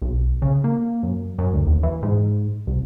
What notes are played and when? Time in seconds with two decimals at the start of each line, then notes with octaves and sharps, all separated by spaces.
0.02 B1
0.42 C#3
0.64 A#3
1.03 F#2
1.38 F#2
1.54 D2
1.67 D#2
1.83 E3
2.03 G#2
2.67 C2